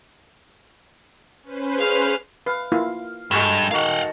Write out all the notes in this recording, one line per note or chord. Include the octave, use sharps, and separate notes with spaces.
C#4 B4 C5
G#4 F5 F6
B4 F5
A#3 E4 F4
G2 G#3 F#4 A4
D#3 F#4 F5 F#5